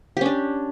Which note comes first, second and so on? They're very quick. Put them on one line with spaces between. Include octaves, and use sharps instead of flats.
G4 C#4 D4